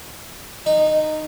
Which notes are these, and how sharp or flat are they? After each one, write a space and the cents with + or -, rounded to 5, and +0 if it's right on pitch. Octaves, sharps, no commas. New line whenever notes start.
D#4 -15